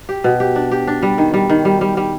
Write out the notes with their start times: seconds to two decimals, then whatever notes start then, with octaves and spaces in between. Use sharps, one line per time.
0.09 G4
0.24 B2
0.40 G4
0.56 D4
0.71 G4
0.87 D4
1.02 G3
1.18 D#3
1.34 G3
1.49 D#3
1.65 G3
1.81 G3
1.97 G3